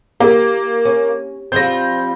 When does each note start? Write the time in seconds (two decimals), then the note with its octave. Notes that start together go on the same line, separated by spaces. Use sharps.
0.20 A#3 G4
0.85 C#4
1.52 F3 G3 C4 G6 A#6